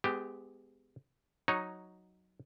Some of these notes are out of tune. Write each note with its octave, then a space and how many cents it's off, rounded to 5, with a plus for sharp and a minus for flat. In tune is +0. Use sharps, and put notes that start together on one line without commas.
G#3 +0 B3 +40 G4 +0
F#3 +0 D#4 +0 C#5 +0